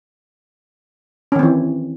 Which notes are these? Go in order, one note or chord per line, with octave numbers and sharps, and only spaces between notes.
D#3 E3 C4 C#4